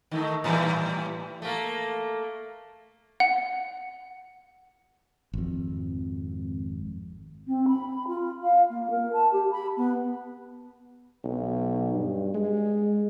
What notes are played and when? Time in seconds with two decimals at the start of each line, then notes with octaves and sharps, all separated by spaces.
0.11 D#3 A3 D#4
0.44 A2 E3 G3
1.42 A3 A#3
3.20 F#5
5.34 G#1 F2
7.47 C4
7.68 B5
8.07 F4
8.43 F5
8.69 A#3
8.90 A#4
9.13 A5
9.32 G4
9.51 B5
9.76 B3
11.24 B1
11.94 G2
12.34 G#3